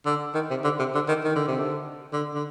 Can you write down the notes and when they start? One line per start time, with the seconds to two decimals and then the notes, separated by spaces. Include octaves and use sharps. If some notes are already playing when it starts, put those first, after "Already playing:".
0.06 D3
0.35 D#3
0.50 C3
0.64 D3
0.79 C3
0.95 D3
1.09 D#3
1.24 D#3
1.35 D3
1.47 C3
1.59 D3
2.13 D3
2.34 D3